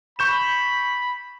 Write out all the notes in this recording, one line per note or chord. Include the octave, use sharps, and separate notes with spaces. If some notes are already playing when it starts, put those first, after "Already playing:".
B5 C#6 G6 E7